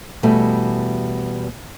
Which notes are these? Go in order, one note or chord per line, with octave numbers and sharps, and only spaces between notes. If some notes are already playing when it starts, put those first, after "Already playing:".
E2 B2 G3 A3